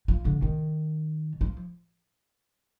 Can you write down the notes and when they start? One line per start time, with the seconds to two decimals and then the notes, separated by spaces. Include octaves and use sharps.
0.08 F3
0.25 D3
0.42 D#3
1.41 F3